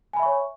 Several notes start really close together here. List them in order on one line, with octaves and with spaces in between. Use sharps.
G#5 B5 E5 C#6 C#5